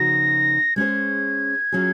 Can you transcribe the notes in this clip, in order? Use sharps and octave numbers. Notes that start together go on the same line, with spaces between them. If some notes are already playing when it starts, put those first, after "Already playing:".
Already playing: C#3 F3 A#3 D#4 F#4 A#6
G#3 C#4 G#4 C5 G#6
F#3 C#4 F4 G#4